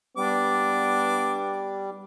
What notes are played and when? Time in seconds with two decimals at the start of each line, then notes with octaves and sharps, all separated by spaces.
0.17 G3 B3 D4 D6